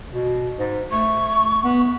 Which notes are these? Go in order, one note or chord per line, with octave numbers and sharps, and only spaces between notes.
B2
G#2
A3 C#6
B3